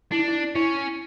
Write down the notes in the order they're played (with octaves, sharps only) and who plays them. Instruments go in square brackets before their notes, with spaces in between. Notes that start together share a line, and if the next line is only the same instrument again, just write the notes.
[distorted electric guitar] D4 [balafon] E4
[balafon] D#4
E4
[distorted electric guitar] C#4 [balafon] E4